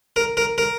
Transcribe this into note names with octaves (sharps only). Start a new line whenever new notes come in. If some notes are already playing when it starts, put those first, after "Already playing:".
A#4
A#4
A#4